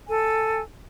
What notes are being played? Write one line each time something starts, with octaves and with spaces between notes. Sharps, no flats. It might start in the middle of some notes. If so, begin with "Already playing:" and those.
A4 G#5